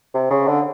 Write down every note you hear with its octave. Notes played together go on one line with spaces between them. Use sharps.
C3
C#3
D3